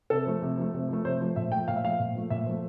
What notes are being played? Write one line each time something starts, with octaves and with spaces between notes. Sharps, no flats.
C3 A4
F3 A3
C3
F3 A3
C3
F3 A3
C3 C5
F3 A3
A#2 E5
F3 A3 G5
A#2 F5
E5
F3 A3 F5
A#2
F3 A3
A#2 E5
F3 A3